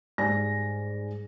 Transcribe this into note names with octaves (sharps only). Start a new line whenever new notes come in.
G#2 G3 D5 G#5 A#6